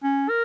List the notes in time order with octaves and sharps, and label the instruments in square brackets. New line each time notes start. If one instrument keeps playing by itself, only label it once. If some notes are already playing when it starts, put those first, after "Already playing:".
[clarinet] C#4
A#4